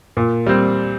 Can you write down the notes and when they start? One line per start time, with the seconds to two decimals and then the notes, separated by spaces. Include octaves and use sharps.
0.17 A#2
0.46 G3 C4